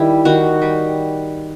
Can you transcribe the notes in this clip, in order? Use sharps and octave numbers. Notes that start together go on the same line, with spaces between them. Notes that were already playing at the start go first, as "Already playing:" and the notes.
Already playing: D#3 G3 E4
D#3 F#4
G3